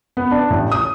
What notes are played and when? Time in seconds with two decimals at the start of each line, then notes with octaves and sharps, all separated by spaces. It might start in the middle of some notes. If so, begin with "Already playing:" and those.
0.17 B3
0.31 D4
0.50 A1
0.72 D#6